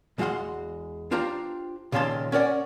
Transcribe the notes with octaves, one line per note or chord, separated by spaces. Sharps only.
E2 G#3 F#4 F5 F#5 C6
D4 F4 G4 C5 A#5
C#2 A#2 D#3 C#4 A5 C6
C#4 A#4 D5 F#5